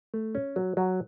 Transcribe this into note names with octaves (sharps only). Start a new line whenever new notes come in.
A3
C#4
F#3
F#3